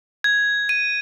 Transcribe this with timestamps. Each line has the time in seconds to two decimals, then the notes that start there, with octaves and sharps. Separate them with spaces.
0.24 G#6
0.69 D#7